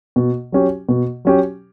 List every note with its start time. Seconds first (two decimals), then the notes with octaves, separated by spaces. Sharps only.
0.16 B2
0.52 F#3 C#4 G4
0.89 B2
1.25 F#3 C#4 G4